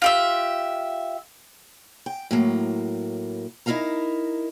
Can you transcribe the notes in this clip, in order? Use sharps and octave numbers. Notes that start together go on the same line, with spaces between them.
F4 G4 E5
G5
A2 F#3 A#3
D#4 E4 F#4 A#4 F5 A#5